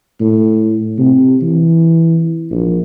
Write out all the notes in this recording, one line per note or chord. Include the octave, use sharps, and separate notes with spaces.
A2
C3
E3
A#1